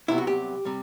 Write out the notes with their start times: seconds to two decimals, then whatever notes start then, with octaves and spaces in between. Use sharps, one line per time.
0.08 C2 C3 F#3 B3 E4
0.18 F#4
0.27 G4
0.65 C3 G3